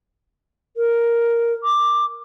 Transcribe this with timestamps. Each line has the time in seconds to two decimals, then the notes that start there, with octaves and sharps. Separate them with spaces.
0.77 A#4
1.64 D6